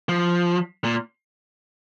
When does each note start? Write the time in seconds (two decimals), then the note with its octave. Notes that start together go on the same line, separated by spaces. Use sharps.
0.09 F3
0.84 A#2